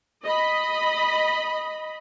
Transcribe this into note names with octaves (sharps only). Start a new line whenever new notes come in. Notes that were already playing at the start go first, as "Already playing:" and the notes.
D#5 B5